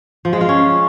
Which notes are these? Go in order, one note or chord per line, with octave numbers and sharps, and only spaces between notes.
F3
G#3
F4
C#4